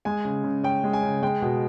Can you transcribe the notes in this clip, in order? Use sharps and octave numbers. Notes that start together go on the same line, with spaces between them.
G#3 G#5
C#3
C#3
C#4 G5
G#3
G#5
C#3
G#3 G5
B2